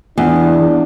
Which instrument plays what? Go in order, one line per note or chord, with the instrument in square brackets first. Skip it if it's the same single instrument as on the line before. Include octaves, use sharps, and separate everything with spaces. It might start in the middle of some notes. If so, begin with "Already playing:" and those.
[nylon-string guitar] E2 [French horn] D4